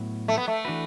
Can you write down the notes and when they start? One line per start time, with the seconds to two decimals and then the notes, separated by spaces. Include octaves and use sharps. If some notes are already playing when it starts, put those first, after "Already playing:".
Already playing: A2 F#3 B3
0.28 A3
0.38 B3
0.48 A3
0.65 E3 D4 F#4 B4